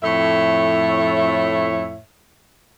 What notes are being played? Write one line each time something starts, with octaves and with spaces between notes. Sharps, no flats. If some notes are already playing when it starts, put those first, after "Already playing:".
F2 A2 C#5 E5